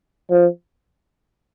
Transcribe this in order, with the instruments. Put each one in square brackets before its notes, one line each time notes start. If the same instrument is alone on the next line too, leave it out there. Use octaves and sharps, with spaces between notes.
[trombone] F3